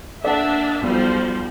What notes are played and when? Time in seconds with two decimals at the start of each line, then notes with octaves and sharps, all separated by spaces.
0.24 A#3 D4 D5 E5 F#5 A5
0.82 B1 F3 G3 C5